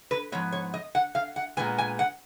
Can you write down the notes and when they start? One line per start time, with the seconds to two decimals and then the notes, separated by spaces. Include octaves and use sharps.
0.11 B4
0.32 G#2 F3 B3 C#5
0.52 C#5
0.74 D#5
0.95 F#5
1.15 F5
1.36 F#5
1.57 A#2 G#3 B3 G#5
1.78 G#5
1.99 F#5